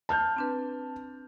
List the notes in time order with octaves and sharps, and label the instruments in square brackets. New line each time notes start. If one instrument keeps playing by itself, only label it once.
[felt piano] A5 F6 G6
[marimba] C4 D4 B4